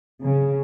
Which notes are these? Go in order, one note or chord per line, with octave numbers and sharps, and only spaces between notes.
C#3